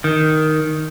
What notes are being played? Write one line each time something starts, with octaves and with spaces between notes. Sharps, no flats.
D#3